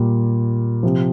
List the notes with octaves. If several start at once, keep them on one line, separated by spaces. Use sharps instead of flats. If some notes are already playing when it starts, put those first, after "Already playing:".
Already playing: A#2 G3
C3 F3